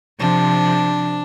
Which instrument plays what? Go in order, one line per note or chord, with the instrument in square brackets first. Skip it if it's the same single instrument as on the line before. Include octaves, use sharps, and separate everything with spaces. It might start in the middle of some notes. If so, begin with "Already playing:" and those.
[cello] C3 F3 [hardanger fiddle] D4